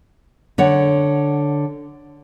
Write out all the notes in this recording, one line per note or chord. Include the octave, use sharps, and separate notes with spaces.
D3 C#5 F#5